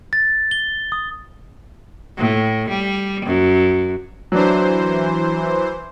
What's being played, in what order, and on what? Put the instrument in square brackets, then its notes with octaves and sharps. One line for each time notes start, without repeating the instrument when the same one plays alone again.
[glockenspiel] A6
G7
D#6
[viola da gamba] A2
G3
F#2
[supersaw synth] E3 C5 [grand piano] F#3 D4